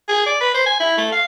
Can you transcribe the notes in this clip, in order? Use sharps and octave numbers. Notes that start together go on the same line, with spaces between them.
G#4
D5
B4
C5
G#5
E4
A3
F5